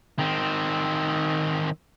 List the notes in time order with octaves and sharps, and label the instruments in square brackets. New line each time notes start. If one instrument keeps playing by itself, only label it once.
[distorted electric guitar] D#3 C4